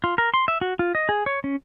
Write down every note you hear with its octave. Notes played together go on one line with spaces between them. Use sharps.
F4
A#4
C6
E5
F#4
F4
D#5
G#4
C#5
C#4